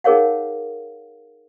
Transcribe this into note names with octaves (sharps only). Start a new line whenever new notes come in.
D#4 G#4 A#4 C#5 F5 F#5